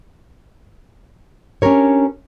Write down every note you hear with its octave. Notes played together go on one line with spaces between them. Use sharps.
C#4 D4 G4 A#4 C#5